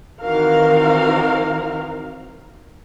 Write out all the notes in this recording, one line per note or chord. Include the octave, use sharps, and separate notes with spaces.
D#3 E3 C4 F#4 A#4 F5